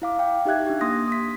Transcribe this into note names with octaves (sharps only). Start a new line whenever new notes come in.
E4 F5 D6
F5 G5 D6
D#4 G4 E5 F#6 G#6
D4 G4
A#3 C6 D#6 A#6
D#6 B6